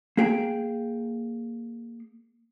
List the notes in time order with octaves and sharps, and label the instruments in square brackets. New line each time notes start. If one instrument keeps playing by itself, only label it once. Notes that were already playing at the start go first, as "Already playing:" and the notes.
[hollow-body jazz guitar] A#3 G#4 G5